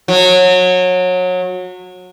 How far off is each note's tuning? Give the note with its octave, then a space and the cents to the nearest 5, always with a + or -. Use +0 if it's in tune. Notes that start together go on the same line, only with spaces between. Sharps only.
F#3 -25